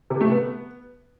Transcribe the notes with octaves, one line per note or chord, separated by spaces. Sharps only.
C3
A3
B3